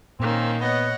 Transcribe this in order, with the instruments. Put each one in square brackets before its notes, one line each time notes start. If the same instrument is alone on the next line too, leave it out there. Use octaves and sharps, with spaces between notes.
[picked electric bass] A#2 [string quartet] D#3 A#3 C#4 [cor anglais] C4
[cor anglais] B3 [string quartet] C#5 D#5 F#5